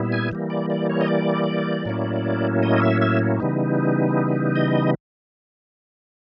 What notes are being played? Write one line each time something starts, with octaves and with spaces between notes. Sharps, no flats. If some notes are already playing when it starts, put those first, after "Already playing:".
Already playing: A#2 G3 B3 E4
G#5
E3 G3 A#3
D5
D5
C#5
D#5
D5
A2 F#3 A#3 C#4 E4
D#5
E5
E5
C#3 E3 G3 B3 D#4
D#5